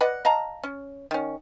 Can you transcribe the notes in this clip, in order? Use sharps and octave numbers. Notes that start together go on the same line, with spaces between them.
B4 D5 D#5 F#5
D#5 F5 A5 A#5
C#4
D#3 C#4